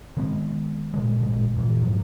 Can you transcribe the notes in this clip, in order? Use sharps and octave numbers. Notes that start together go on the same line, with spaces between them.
D#3 G#3 B3 C4
A#2 D3 G#3
A1 A#2 G#3
F2 A#2 E3
G#2 F3 F#3